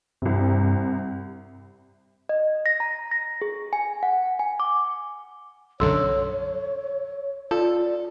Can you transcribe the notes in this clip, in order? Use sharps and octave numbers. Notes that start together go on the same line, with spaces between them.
C2 G2 C3
D#5
A#6
A#5
A#6
G#4
G#5
F#5
G#5
D6
B1 F#2 D3 A4 C#5 C6 E6
F4 A4 D5